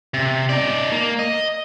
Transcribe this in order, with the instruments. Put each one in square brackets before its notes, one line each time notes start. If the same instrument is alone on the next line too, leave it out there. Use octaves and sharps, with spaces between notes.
[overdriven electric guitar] C3
D#4 D5
A#3
D#5